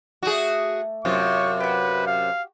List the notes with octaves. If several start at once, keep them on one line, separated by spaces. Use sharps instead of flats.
A3 F#4 G#4 D5
F#2 C3 F4 C#6
F#4 G4 B4
F5